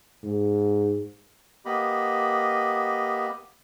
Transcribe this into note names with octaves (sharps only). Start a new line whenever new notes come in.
G#2
A#3 B3 G4 D#5 B5